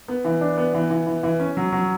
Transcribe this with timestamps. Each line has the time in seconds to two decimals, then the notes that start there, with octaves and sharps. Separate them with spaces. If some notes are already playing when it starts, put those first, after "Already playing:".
0.08 B3
0.25 E3
0.41 D4
0.58 B3
0.74 E3
0.90 E3
1.07 E3
1.23 E3
1.40 C#4
1.57 F#3
1.72 F#3